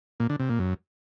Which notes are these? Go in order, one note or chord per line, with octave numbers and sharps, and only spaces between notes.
A#2
D3
C3
A#2
F#2